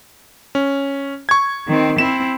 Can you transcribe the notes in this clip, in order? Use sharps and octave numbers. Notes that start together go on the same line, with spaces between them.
C#4
C#6 G#6
D#3 C4
C4 E4 E7